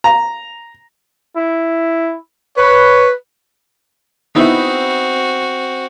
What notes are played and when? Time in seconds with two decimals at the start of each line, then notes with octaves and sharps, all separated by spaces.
0.04 A#5
1.37 E4
2.58 B4 C#5
4.35 B3 C4 D#4 E4 F#4